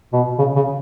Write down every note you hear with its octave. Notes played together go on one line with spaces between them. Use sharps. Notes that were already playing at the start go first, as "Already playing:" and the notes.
B2
C#3
C#3